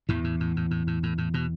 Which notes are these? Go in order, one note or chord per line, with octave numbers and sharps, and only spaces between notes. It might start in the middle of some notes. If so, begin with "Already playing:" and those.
E2 A2 E3
A2
A2
A2
A2
A2
A2
A2
B2